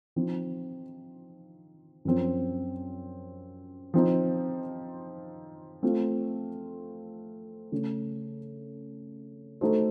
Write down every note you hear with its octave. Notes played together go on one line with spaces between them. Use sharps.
F3 C4 D#4
F#2 F3 C4
F3 C4 D#4
A3 C4 F4
C#3 A3 C#4
A3 D#4 F#4 A4 C5